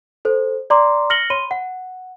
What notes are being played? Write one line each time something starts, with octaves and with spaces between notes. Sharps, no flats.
A4 C5
D5 A#5 C6 D6
F6 A#6 C#7 F#7 G7
C#5 B5 C6 D#7 G7
F#5